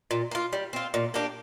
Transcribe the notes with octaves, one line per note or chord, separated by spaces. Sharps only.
A#2
A#3 F4
G3
C4 F4
A#2
A#3 D4 G4